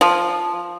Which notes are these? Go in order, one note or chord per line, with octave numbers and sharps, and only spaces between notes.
F3